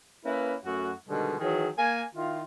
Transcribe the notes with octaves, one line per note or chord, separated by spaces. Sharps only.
A#3 C#4 E4 B4
F#2 A3 F#4
B2 D3 D#3 G3 G#3
D#3 E3 F#3 G#4
A#3 G#5
D#3 E4 F4